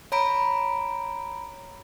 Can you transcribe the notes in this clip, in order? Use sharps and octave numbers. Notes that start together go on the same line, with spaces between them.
C#5 A#5 B5 D7